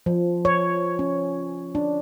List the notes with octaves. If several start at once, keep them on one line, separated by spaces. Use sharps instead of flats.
F3
C#5
C#4
D4